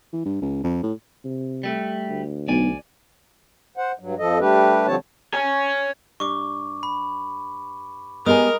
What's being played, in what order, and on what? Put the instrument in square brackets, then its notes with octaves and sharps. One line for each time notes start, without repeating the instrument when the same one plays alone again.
[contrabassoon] E3
G2
C#2
F2
A2
[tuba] C3
[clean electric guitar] G3 A3
[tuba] D2
[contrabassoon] B1 [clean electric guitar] D5 G#5
[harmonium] C5 F#5
G2 F#3
F2 F3 A4 D#5
G3 A3 D4 G4 B4
D3 F3 G3 C4 C#5 A5
[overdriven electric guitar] C#5 G#5
[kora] G2 [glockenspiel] C#6 D6
[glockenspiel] B5
[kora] G#3 D#4 G5 [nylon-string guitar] B3 G4 G#5 [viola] A#4 [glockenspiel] D#6